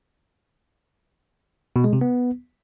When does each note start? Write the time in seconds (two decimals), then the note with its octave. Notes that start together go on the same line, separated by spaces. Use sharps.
1.76 B2
1.84 G#3
1.93 C3
2.01 B3